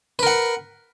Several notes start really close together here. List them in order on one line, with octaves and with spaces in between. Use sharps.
B4 A#4 F#5